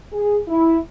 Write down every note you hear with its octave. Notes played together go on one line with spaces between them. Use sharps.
G#4
E4